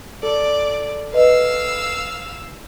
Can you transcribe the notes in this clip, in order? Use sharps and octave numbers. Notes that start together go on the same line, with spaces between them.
A4 D5
B4 D#5 F5 E6